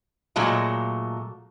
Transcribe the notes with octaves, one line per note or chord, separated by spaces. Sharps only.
A#2 F#3 G#3 A3